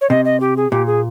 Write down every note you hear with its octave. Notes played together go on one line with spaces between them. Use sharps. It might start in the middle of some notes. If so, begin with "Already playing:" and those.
C#5
C3 D#5
D#5
G4
G#4
A#2 G4
G#4